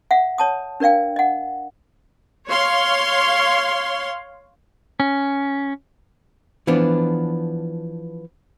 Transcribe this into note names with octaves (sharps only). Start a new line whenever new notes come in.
E5 F#5
C#5 A5 D#6
D4 A#4 D5 F5 G5
D#5 F#5
C#5 F5 C6
C#4
E3 F3 B3 D4